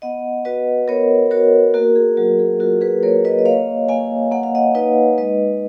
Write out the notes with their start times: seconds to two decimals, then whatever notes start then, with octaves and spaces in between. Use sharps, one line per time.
0.02 B3 D#5 F#5
0.45 F#4 B4 D#5
0.88 B3 A#4 C#5
1.31 F#4 A#4 C#5
1.74 A#3 F#4 A#4
1.95 G#4
2.17 F#3 F#4
2.39 G#4
2.60 F4 F#4 A#4
2.81 G#4 B4
3.03 A#3 A#4 C#5
3.25 B4 D#5
3.39 D#5
3.45 A#3 C#5 F5
3.89 A#3 F5 G#5
4.32 A#3 F#5
4.43 F5
4.55 D#5 F#5
4.75 D#4 B4 D#5
5.18 G#3 B4 D#5